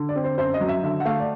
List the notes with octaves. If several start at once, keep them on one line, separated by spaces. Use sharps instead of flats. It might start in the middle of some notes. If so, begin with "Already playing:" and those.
Already playing: D3
D5
C4
C5
F#2 C5
D#5
F#3
E5
D3 E5
F#5
A3 F5
D5